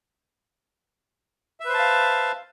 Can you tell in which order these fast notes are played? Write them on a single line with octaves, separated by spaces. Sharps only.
E5 B4 C5 A5 F5